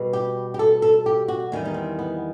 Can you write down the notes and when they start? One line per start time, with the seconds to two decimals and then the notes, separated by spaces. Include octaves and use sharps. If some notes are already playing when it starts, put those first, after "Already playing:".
Already playing: B2 G3
0.13 G4
0.54 G4
0.59 A4
0.82 A4
1.06 G4
1.28 F#4
1.52 E2 D#3 G3
1.65 D#4
1.74 C4
1.99 B3